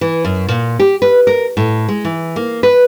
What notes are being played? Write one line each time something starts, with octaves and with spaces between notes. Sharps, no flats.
E3
F#2
A#2
G4
B4
A#4
A2
G#3
E3
A#3
B4